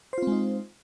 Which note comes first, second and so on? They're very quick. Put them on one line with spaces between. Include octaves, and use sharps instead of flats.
C5 F4 C4 G#3 D#4